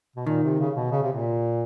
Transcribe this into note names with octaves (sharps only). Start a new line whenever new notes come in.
B2
A#2 D#3
C3
C#3
B2
C#3
C3
A#2